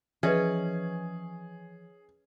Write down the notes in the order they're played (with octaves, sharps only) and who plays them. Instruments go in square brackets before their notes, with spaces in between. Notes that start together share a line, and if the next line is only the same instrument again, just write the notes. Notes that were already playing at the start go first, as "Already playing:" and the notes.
[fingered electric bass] E3 F3 [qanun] C#4 [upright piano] G#4 [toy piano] B4 D#5 E5